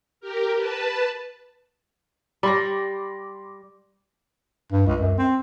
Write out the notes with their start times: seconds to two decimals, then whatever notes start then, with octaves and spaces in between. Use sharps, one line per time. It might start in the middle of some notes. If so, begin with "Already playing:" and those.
0.21 G4 A#4
0.55 B4 A5
2.43 G3 B5 C6 D6 A#6
4.73 G2
4.87 C#2
5.01 F#2
5.19 C4